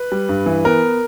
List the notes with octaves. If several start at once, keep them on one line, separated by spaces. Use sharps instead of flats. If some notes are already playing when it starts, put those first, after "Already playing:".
Already playing: B4
G3
G2
E3
B3 A#4